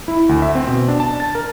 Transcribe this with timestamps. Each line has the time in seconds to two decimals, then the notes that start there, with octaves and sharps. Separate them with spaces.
0.08 E4
0.29 D2
0.42 E5
0.55 C4
0.67 B2
0.88 D4
1.00 A5
1.20 A6
1.35 A#4